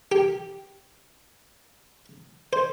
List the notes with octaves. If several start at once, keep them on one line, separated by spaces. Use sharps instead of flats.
G4
C5